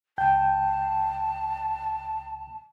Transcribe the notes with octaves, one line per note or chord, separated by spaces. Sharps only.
C#2 G5 A5 G6